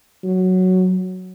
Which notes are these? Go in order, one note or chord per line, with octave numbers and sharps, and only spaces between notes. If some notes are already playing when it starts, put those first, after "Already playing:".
F#3